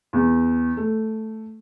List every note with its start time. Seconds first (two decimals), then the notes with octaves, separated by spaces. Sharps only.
0.13 E2
0.77 A3